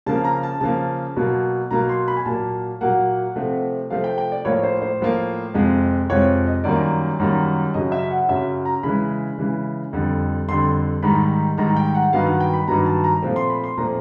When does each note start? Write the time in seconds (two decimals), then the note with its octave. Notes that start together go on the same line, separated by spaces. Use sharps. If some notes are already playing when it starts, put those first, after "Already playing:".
0.06 C#3 F3 A#3 A5
0.24 A#5
0.43 A5
0.61 C#3 F3 A#3 A5
1.16 B2 F#3 A#3
1.71 B2 F#3 A#3 A#5
1.89 C6
2.08 B5
2.17 G#5
2.26 A#2 F#3 A#3 A5
2.81 A#2 F#3 A#3 F#5
3.36 C3 F3 A3 C4
3.90 C3 F3 A3 C4 F5
4.04 G5
4.18 G5
4.32 D5
4.45 A2 F3 A#3 C#5
4.63 C5
4.82 C5
5.00 A2 F3 A#3
5.54 F2 C3 F3 G#3
6.09 F2 C3 F3 G#3 C#5
6.47 D#5
6.64 F#2 D#3 G3 A#3 D5
7.20 F#2 D#3 G3 A#3
7.74 F#2 C#3 F#3 D#5
7.92 E5
8.11 F#5
8.29 F#2 C#3 F#3 E5
8.65 A#5
8.83 C#3 E3 G#3 B5
9.38 C#3 E3 G#3
9.93 F2 D3 G3
10.48 F2 D3 G3 C6
11.03 G#2 D#3 G3 B5
11.58 G#2 D#3 G3 A#5
11.76 G5
11.95 F#5
12.13 G2 D#3 F#3 B3 F5
12.26 F#5
12.40 G5
12.54 B5
12.67 G2 D#3 F#3 B3 A#5
12.86 A5
13.04 A#5
13.22 A#2 F3 A3 C4
13.36 C6
13.50 B5
13.64 C6
13.77 A#2 F3 A3 C4 A#5